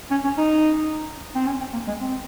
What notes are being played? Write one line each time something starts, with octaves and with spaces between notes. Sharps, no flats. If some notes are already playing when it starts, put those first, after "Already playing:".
C#4
C#4
D#4
C4
C#4
C4
A#3
G#3
C4